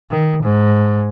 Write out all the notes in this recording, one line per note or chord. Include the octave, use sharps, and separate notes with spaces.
D#3
G#2